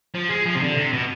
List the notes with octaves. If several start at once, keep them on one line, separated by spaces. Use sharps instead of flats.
F3
G#3
F3
C3
D3
C3
B2